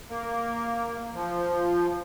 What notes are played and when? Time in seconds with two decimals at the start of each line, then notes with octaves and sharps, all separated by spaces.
0.09 A#3
1.14 F3